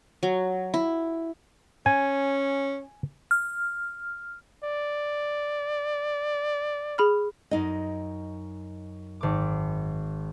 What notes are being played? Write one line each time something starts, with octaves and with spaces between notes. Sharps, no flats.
F#3
E4
C#4 G#5
F6
D5
G#4 B5 F6
F#2 D#4 D#5
G#1 D6